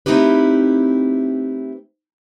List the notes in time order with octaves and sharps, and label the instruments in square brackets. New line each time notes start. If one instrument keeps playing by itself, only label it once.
[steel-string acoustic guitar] A3 C4 D#4 E4 G4 B4